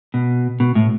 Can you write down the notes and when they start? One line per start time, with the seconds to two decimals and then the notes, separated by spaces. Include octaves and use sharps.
0.14 B2
0.60 B2
0.75 A2